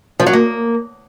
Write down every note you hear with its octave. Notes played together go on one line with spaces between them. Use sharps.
F3
F#3
A#3